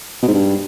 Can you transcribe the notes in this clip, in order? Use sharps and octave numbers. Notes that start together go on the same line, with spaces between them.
B2
G#2
G2